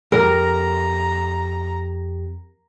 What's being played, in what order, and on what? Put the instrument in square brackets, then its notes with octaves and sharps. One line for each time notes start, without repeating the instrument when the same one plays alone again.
[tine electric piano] F2 G4 [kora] A#4 [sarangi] A#5